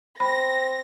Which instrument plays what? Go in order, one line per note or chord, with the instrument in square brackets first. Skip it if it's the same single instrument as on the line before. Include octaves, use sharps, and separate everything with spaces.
[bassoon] C4 [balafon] B5 [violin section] A#6